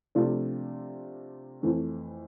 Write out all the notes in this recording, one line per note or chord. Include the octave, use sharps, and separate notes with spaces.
C3 F3 A3 D4 F4
F2 E3 A3 C4